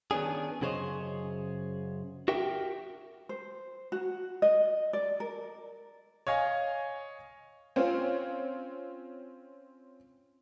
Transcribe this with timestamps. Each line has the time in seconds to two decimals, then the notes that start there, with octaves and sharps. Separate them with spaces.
0.11 D#3 B3 C#4 D4 G#4
0.61 F#2 C#3 G#4 C5 C#5 D#5
2.28 F#4 G4 A#4 E5 G5
3.29 C5
3.92 F#4
4.42 D#5
4.93 D5
5.20 A#4
6.27 C#5 D#5 F5 G#5
7.76 C4 C#4 F4